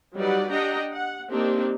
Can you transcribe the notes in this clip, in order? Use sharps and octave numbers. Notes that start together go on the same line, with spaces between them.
F#3 G3 D#4 B4 D5 F#5
D4 G4 D#5 F#5 G5 A#5
F#5
A#3 C4 D4 D#4 G4